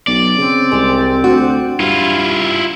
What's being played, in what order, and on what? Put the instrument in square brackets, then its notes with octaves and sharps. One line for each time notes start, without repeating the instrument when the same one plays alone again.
[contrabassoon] B1 [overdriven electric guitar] D5
[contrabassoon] C#3 [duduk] C4
[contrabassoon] C2 [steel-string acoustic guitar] G#3
[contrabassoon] D2 [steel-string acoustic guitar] F#4
[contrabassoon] G2 [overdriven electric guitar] E4 F4